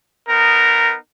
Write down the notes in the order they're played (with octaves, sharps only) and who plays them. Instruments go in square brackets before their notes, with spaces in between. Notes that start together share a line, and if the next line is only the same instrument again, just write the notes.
[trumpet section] B3 D#4 A#4